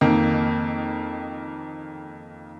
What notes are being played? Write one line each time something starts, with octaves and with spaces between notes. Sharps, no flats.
F2 D#3 A#3